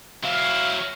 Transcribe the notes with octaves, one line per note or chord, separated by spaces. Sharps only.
F#3 E4 F5